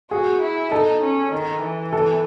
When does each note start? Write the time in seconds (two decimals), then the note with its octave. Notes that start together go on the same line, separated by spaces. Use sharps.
0.11 F#4 G#4
0.41 E4
0.72 D#4 A4
1.02 C#4
1.32 D#3
1.63 E3
1.93 A4